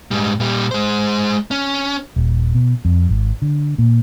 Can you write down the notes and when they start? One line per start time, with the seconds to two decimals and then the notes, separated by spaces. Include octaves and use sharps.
0.11 G#2 G3
0.40 A#2 G3
0.71 G#3 C5
1.51 C#4
2.16 D#1
2.55 B2
2.85 F2
3.09 G#1
3.42 D3
3.78 A#2